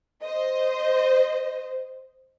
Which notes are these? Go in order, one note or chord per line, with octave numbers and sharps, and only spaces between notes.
C5 D#5